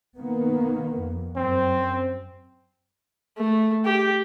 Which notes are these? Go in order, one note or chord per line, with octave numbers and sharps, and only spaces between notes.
D#3 A#3 B3
F2
F#2 C4
A3
G4